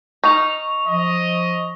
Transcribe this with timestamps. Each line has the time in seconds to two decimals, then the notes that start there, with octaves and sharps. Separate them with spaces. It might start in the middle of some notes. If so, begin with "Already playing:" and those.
0.24 D#4 C#6 F7
0.88 F3 D#5